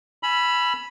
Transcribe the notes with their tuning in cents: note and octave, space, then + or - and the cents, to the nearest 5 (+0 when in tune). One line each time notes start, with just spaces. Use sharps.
G#5 +20 B5 -5 E6 +35